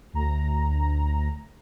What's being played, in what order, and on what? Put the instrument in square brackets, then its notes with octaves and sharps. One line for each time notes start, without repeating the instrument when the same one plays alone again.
[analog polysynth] D2 A#5